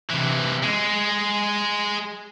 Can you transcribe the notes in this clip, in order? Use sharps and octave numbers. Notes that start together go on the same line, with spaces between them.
C3 E3
G#3